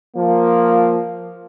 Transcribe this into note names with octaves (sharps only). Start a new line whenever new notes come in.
F3 A#3